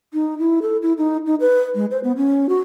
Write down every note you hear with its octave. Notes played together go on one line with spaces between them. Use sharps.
D#4
E4
A4
E4
D#4
D#4
B4
G#3
C5
B3
C#4
F#4